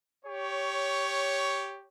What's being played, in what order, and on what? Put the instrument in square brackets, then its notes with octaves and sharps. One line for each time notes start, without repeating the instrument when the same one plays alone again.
[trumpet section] G4 C#5